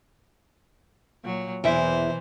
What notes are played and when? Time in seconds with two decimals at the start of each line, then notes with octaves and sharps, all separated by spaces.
1.24 A#2 F#3
1.64 E2 B2 E3 E4 C5 E5